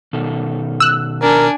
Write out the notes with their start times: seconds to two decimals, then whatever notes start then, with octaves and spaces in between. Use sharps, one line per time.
0.13 B2 D#3 A4
0.80 E6 F#6
1.23 D4 A#4 G#5